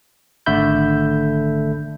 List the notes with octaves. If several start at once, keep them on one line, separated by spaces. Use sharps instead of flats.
G#1 D3 A3 E5 B5 G6